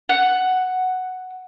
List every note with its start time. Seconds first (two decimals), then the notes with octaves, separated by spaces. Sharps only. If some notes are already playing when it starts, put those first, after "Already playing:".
0.09 F#5